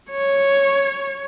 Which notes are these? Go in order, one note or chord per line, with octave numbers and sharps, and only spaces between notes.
C#5